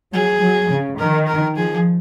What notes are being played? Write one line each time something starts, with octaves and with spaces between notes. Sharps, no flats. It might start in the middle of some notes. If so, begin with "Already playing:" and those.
F#3 G#4
F#3
C#3
D#3 A#4
A#4
F3 G#4